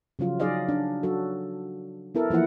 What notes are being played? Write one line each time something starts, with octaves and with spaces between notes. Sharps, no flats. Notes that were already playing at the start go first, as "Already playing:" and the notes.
C#3 F3 F#3 F4
F#3 D#4 G#4 D5 D#5 F5
D4
F#3 F#4 A4
B3 E4 A4 A#4
E3 F3 A#3 E4 F#5